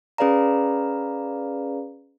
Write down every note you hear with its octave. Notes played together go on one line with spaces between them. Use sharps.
C#4 G#4 B4 D5 F5 A#5